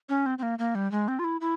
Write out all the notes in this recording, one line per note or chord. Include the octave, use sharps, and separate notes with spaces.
C#4
C4
C4
A#3
A#3
G3
G#3
C4
F4
E4
E4